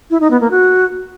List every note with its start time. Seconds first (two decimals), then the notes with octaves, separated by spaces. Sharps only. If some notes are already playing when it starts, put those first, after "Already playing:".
0.10 E4
0.21 D#4
0.31 B3
0.41 A#3
0.51 F#4